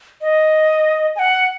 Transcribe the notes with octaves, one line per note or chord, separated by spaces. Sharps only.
D#5
G#5
F#5